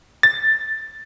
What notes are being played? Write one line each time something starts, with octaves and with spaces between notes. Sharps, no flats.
A6